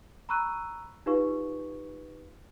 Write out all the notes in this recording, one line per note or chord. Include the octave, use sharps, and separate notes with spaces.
A#5 B5 C#6 E6 F#6 D#7
D#4 F4 G4 B4 F5 C#6